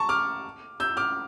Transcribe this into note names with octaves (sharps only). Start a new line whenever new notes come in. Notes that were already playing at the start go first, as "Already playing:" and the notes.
Already playing: A5 A#5 C#6
D6 F6
E6 G6
D6 F6